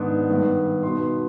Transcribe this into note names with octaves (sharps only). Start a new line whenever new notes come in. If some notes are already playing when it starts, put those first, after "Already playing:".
Already playing: G#2 D#3 B3 D4 D6
G2 D#3 B3
B2 B3 D#4 C6
C6